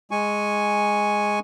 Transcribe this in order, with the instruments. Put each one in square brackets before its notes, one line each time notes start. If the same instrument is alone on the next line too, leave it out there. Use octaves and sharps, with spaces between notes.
[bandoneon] G#3 G#5 C#6